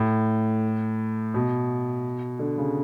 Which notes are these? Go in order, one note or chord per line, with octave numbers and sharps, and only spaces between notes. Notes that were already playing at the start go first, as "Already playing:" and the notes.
Already playing: A2
B2
D3
C#3